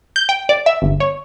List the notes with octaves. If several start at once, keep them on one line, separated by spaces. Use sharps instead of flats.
G6
G5
D5
E5
G1
C#5